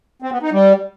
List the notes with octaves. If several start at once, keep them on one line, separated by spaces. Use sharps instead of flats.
C4
B3
D#4
G3